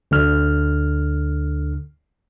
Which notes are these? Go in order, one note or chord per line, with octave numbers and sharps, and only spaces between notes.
D2 D3 F6